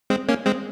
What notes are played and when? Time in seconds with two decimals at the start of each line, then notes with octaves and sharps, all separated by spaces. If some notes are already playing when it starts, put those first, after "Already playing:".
0.10 G#3 C4
0.29 A#3 C#4
0.46 G#3 C4